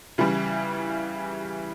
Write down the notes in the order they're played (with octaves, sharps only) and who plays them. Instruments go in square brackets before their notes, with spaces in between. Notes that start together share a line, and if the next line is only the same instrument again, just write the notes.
[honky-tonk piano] C#3 E3 G3